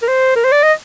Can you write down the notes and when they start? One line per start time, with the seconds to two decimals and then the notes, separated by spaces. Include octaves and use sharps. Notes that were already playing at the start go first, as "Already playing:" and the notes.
0.02 A#4
0.08 C5
0.36 A#4
0.44 C5
0.52 D5
0.63 D#5